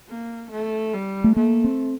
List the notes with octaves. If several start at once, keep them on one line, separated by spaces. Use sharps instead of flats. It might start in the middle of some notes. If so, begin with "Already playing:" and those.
A#3
A3
G3
A3
A3 A#3
C4